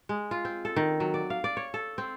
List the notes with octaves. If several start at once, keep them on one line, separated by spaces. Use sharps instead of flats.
G#3
F4
C4
A4
D#3
F#3
D5
F5
D5
C#5
A4
C4